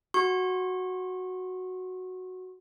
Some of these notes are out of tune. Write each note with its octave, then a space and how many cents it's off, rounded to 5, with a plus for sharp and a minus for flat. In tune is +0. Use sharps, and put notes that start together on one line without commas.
F#4 +0 C#6 -25